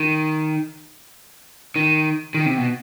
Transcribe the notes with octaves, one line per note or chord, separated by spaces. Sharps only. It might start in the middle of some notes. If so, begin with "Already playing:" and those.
Already playing: D#3
D#3
D#3
C3
B2